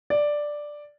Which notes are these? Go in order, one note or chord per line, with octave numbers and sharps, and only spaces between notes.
D5